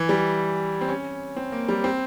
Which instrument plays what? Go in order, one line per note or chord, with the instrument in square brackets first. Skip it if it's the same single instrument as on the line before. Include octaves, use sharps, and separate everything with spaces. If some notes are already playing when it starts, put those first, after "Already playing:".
Already playing: [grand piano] E3
G3
C4
C#4
C4
A#3
G3
C4